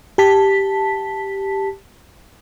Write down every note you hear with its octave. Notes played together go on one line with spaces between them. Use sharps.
G4 A5 B6